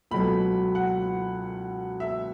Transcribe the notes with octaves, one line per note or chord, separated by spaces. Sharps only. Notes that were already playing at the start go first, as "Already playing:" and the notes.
C#2 B2 F#3 A3 B5
F#5
E5